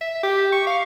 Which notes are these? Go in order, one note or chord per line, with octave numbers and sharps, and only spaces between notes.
E5
G4
C#6
F5